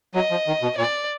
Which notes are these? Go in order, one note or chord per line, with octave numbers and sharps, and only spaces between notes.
F#3 D#5
F3
D#3
B2
A#2 D5